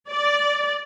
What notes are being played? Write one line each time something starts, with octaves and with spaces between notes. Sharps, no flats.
D5